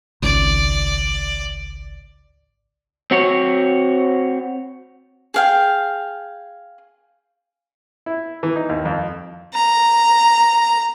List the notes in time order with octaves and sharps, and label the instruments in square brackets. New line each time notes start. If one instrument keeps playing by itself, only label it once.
[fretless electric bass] G#1 C#2 [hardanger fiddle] D5
[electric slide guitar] C4 F#4 C#5
[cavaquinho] G#4 F5 G5
[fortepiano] E4
E3
D#4
D#2
F2
[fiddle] A#5